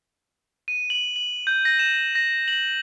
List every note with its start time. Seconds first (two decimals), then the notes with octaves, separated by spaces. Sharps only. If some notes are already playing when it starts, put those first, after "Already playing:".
0.68 D#7
0.90 F#7
1.16 F#7
1.47 G6
1.65 A#6
1.79 E7
2.15 A#6
2.48 F#7